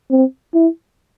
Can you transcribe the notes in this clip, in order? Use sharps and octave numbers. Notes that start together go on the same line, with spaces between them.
C4
E4